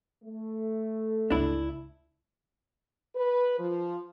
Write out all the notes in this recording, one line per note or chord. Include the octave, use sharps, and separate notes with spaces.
A3
G1 C#2 D4 E4
B4
F3